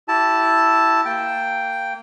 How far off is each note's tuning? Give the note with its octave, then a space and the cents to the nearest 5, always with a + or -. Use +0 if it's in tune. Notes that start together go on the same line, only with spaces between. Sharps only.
E4 +0 G4 -25 A5 +0
A#3 -25 G5 +0